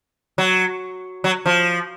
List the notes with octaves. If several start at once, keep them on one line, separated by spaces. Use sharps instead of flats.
F#3
F#3
F3